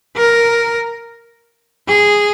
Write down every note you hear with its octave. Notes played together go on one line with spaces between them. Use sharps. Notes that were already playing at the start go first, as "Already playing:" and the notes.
A#4
G#4